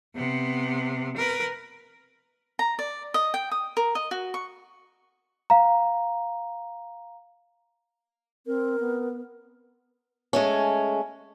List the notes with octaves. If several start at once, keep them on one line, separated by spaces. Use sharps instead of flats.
C3 B3
A#4 B4
A#5
D5
D#5
G5
D#6
A#4
D#5
F#4
C#6
F5 A#5
C4 A#4
B3
G#3 A3 C#4